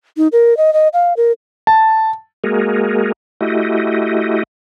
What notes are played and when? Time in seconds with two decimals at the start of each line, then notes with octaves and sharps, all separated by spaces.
0.17 D#4
0.32 A#4
0.57 D#5
0.73 D#5
0.93 F5
1.17 A#4
1.67 A5
2.44 G#3 A#3 F#4 G#4 A#4
3.41 A3 E4 F#4 G4 D#5